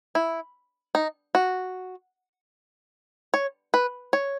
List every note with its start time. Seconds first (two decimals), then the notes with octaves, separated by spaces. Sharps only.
0.15 E4
0.95 D#4
1.35 F#4
3.34 C#5
3.74 B4
4.13 C#5